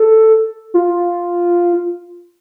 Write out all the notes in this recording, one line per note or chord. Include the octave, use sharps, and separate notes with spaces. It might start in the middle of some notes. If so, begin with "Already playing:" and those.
Already playing: A4
F4